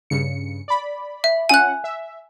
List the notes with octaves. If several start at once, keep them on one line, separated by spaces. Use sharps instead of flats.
G2 C#3 C#7
D5 B5
E5
C#4 F4 F#5 G#5 F#6
E5